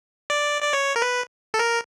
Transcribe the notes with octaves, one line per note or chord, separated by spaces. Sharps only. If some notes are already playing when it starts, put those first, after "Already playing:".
D5
D5
C#5
A#4
B4
A4
A#4